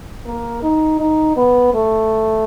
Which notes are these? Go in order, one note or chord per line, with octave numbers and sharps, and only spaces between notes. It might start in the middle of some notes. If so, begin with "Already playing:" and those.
A#3
D#4
D#4
B3
A3